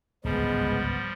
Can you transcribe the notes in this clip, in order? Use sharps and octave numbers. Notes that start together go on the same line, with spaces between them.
D1 G#1 C#2 F3 G3 G#3 B3